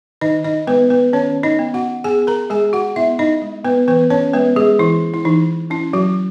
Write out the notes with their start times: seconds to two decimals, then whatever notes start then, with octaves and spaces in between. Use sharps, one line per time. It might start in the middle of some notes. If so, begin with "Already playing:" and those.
0.21 D#3 D#4 D#5
0.44 D#4 D#5
0.67 G#3 B3 B4
0.90 B3 B4
1.13 D#3 C#4 C#5
1.43 D#4 D#5
1.59 B3
1.74 F#4 F#5
2.04 B3 G#4 G#5
2.27 A#4 A#5
2.50 G#3 G#4 G#5
2.73 F#4 F#5
2.96 B3 E4 E5
3.19 D#4 D#5
3.42 G#3
3.65 B3 B4
3.88 E3 B3 B4
4.10 C#4 C#5
4.33 G#3 B3 B4
4.56 G#3 G#4
4.79 E3 E4
5.14 E4
5.25 E3 D#4
5.70 C#4 E4
5.93 F#3 F#4